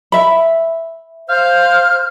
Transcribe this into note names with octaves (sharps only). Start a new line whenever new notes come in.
E5 B5
C5 F5 F6 G6